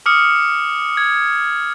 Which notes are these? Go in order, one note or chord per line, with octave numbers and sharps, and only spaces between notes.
D6 D#6 F6 C#7
G#6